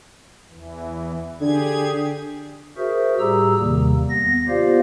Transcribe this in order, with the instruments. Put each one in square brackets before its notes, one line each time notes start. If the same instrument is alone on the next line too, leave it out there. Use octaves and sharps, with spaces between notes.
[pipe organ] E2 E3
[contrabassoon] D3 [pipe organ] G4 G#4 G#6
[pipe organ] F#4 G#4 A#4 C5 E5
A2 G3 G4 G#4 A#5 E6
D#2 C3 D#3 G3 A#3
B3 A#6
B3 F4 G4 C5 D5 F5